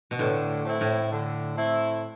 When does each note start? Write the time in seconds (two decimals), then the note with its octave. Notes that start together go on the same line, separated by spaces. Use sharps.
0.11 B2
0.19 A2 D3
0.65 A3 C4 E4
0.81 A2
1.12 D3
1.57 A3 C4 E4